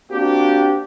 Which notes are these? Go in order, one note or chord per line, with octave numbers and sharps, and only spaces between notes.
A#3 C4 D4 F#4 G4